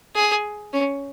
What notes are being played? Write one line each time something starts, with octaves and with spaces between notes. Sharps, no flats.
G#4
C#4